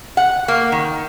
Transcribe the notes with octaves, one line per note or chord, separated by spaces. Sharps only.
F#5
A#3
D#3